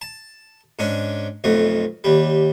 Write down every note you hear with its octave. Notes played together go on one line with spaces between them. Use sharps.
A5
G#2 C#4 D4
B1 F2 A3
D#2 G3